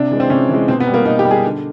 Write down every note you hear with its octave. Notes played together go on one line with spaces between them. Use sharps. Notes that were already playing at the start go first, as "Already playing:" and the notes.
Already playing: C3 D4
E3 G#3
C4
C3 C#4
E3 G#3
B2 C4
B3
G3
A#3
B2 D#4
G4
G3
G#4
D3